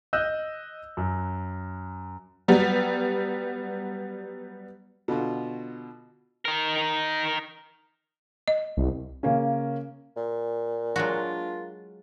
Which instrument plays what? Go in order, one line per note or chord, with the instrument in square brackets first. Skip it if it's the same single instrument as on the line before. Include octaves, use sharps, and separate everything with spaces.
[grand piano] D#5 E6 F#6 G6
F#2
[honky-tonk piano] F#3 G3 B3
[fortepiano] B2 D3 F4 F#4
[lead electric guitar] D#4 A#4
[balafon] D#5
[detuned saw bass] C2
[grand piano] C#3 A#3 C#4
[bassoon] A#2
[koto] F#3 G#3 F#4 [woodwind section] A#3 D4 F4